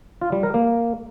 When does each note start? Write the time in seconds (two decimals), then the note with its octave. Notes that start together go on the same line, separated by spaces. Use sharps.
0.21 F4
0.32 G3
0.43 A#4
0.54 A#3